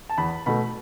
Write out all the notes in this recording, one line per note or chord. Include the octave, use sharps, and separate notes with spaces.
A5
E2 B5
B2 A3 B5